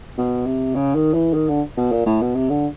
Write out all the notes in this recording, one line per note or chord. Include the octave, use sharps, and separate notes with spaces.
B2
C3
C#3
D#3
E3
D#3
D3
B2
A#2
A2
B2
C3
D3